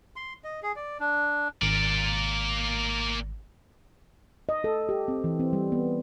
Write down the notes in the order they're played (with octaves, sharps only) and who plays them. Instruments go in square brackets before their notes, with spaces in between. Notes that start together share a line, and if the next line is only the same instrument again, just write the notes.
[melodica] C6
D#5
G#4
D5
D4
[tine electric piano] G#1 [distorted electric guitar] A#3 D5
[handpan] D#5
A4
G4
C4
E3
C4
G3
B3